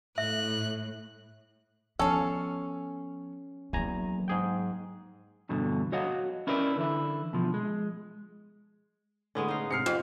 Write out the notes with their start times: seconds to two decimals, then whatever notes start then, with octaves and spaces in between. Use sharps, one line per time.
0.18 A2 E5 F#6
1.99 F3 B3 C#4 A4 F5
3.73 E2 F#3 A#3 G#5 A#5
4.28 G#2 G#4 G5
5.49 E2 G2 B2 D3
5.92 F#4 C#5 D#5 F5 F#5
6.47 C#4 E4 A#4 B4 C#5 D5
6.76 D3 E3 E4
7.33 B2 F3
7.54 G#3
9.35 A2 D3 G#3 B3 C#4
9.48 D#4 F5
9.71 G#2 C3 F6 C7 C#7
9.86 F2 F3